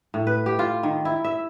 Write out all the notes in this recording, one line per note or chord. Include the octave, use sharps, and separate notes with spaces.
A2
B4
G4
F4
D#3
E4
E5